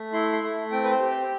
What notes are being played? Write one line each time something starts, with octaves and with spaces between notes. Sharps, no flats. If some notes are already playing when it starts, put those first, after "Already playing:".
Already playing: A3
E4 C6
C6
A3
C4 G5
B4
C5
G4
C5